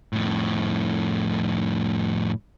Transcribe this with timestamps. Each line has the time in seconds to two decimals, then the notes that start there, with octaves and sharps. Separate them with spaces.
0.13 F2 A2